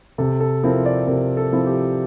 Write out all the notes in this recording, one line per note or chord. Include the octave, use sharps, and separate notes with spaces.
C3 A4
A4
F3 C4 E4 A#4
D5
C3 A#4
A4
F3 C4 E4
G4